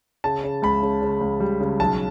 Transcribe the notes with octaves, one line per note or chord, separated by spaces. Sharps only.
C#3 A5
C#3
C#2 B5
C#3
C#3
C#2
G3
C#3
B1 A5